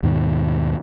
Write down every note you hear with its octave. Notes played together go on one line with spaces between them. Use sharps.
D#2 G#2 B2 D#3